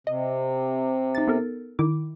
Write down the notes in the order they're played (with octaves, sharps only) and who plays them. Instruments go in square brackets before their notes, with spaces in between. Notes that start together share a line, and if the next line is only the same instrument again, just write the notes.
[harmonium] C3 [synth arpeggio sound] D#5
[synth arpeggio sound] D#4 A6
B3 A4 A#4
D#3 E4 D6